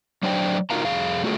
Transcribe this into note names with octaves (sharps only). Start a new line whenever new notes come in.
F#3 D4 C5 D5 G5
D#4 F4 F#4 A#4 F5 A#5
F2 G#4 F5
A3 F4 F#4 G#4 A4